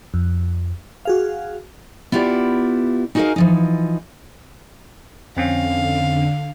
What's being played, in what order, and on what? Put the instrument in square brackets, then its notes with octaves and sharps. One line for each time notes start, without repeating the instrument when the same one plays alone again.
[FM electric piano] F2
F#4 G#4 F5
[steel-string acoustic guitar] B3 E4 F4 G4 D5
D#4 F#4 G#4 A#4 D#5 F5
E3 F3 D#4
[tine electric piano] F2 C4 C#4 [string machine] D3 [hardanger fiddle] F5